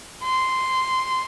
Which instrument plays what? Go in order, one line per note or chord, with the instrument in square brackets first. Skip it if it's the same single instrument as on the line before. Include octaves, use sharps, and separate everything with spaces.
[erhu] C6